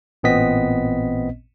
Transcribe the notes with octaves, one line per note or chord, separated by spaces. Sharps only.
A1 A#2 B3 C4 D#5 B6